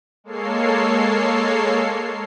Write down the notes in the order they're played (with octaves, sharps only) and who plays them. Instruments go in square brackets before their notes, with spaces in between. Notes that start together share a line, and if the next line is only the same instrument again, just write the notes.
[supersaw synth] G#3 A#3 A4 C#5 C7